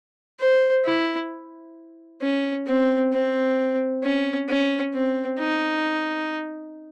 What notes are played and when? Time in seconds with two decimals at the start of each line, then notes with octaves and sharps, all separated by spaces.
0.40 C5
0.85 E4
2.21 C#4
2.67 C4
3.13 C4
4.03 C#4
4.49 C#4
4.94 C4
5.39 D#4